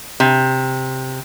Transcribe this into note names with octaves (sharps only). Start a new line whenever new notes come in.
C3